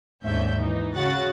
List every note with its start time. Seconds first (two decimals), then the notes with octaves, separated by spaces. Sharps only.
0.23 D#2 G#2 D3 C#4 E5 G6
0.57 E3 D#4
0.94 C#3 F#4 F#5 A6